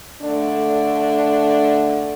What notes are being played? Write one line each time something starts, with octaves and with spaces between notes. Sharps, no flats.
D3 A3 D4